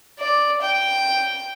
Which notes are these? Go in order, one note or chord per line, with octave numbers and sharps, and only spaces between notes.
D5
G5